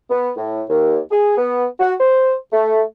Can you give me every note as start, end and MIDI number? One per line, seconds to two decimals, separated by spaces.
0.10 0.30 59
0.37 0.62 45
0.70 0.99 39
1.11 1.36 68
1.37 1.66 59
1.80 1.93 66
2.00 2.34 72
2.53 2.81 57